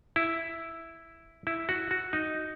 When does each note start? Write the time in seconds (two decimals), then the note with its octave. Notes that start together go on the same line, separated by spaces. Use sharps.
0.16 E4
1.47 E4
1.69 F#4
1.91 F#4
2.13 D#4